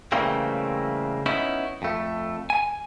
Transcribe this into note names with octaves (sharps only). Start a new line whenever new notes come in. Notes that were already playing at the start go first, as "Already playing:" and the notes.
C#3 E3 G3 A3 A#3 C4
B3 C#4 D#4 E4
F2 A3
G#5